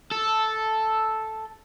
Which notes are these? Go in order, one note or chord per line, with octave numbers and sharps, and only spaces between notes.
A4